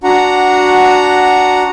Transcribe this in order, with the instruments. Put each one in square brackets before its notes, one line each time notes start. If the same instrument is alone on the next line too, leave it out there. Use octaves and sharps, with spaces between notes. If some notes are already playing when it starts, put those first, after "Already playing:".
[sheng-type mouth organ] D4 F#4 F#5 A#5